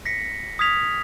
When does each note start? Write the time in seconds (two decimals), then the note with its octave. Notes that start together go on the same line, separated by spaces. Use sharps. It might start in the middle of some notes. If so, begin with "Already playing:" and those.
0.05 A#6 B6 C#7
0.59 D#6 F6 G#6 B6 F7